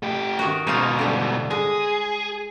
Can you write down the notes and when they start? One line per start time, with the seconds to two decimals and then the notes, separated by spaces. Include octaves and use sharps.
0.03 A3 G4
0.39 D#3 F#4
0.67 G#2 B2 D#4 F4
0.99 D3 G3
1.51 G#3 G#4